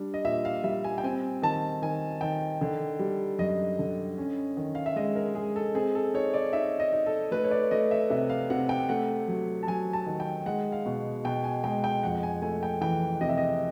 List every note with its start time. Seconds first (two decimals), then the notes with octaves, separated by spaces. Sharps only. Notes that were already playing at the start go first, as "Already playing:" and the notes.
Already playing: G3 D4
0.14 D#5
0.25 A#2 E5
0.45 F5
0.64 G3 E5
0.84 G#5
0.98 G5
1.03 C4 G#5
1.42 D#3 A5
1.82 D#3 G#5
2.21 D#3 G5
2.61 D3
2.99 G3
3.39 F#2 D#5
3.79 D3
4.18 C#4
4.57 D#3
4.75 F5
4.86 E5
4.96 G#3 D#5
5.15 A#4
5.35 G#3 G#4
5.56 A4
5.74 C4 G#4
5.95 A4
6.14 D#4 C#5
6.34 D5
6.53 D#4 E5
6.80 D#5
6.93 D#4
7.06 A4
7.31 A3 B4
7.44 C#5
7.51 D5
7.71 A3 D#5
7.91 E5
8.10 C3 E5
8.30 F5
8.50 C3 F#5
8.69 G5
8.89 A3 F#5
9.28 F#3
9.63 A5
9.67 F#3 G#5
9.93 A5
10.06 D#3
10.20 G5
10.46 G#3 F#5
10.72 F5
10.86 B2
11.25 B2 G5
11.44 G#5
11.64 G#3 G5
11.84 G5
12.03 F2 F#5
12.23 G#5
12.42 A3 G#5
12.63 G5
12.81 E3 G5
13.21 C3 D#5
13.29 E5
13.38 D#5